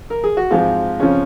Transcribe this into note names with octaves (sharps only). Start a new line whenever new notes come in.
A#4
G#4
F#4
G#2 F3 G#3 C4 F4
F2 C#3 F3 C#4